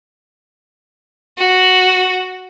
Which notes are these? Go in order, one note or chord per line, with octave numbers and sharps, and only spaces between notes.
F#4